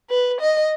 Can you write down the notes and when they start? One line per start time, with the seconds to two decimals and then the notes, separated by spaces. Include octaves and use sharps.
0.10 B4
0.40 D#5